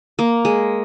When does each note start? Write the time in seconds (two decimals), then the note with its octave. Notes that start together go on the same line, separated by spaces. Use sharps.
0.19 A#3
0.45 G#3